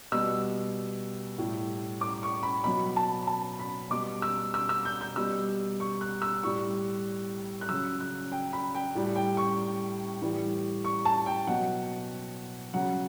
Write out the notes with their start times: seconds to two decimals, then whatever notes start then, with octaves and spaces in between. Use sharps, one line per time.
0.12 B2 G3 E6
1.38 A2 G3
2.01 D6
2.23 C#6
2.43 B5
2.64 B2 F#3 B5
2.96 A5
3.27 A5
3.59 B5
3.90 B2 G3 D6
4.22 E6
4.54 E6
4.69 E6
4.85 G6
5.01 G6
5.16 B2 G3 E6
5.80 C#6
6.01 F#6
6.22 E6
6.43 A2 G3 C#6
7.61 F#6
7.69 C#3 F#3 E6
8.00 F#6
8.32 G5
8.53 B5
8.75 G5
8.95 A2 G3
9.16 G5
9.37 C#6
10.22 A2 E3 G3
10.85 C#6
11.05 A5
11.26 G5
11.47 B2 F#3 F#5
12.73 C#3 F#3 F#5